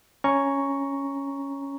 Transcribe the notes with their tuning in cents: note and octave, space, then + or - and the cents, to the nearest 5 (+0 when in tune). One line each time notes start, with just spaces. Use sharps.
C#4 +0 A#5 +0 C#6 +5